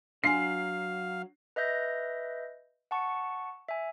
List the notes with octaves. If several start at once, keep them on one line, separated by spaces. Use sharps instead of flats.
F#3 D4 F5 G#5 C7
B4 D#5 E5 G6 A#6
F#5 A5 C#6
E5 G#5